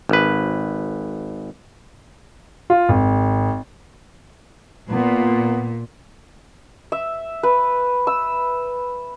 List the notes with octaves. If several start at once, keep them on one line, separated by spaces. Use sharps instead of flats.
G#1 B4
F4
G#1
A#2 B3
E5
B4
E6